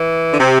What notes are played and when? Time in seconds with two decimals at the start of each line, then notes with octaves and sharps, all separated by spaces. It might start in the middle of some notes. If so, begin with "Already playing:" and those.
Already playing: E3
0.32 D3
0.39 C3